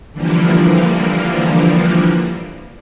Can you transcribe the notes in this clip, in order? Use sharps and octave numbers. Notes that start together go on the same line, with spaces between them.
D3 E3 F3 G3 A#3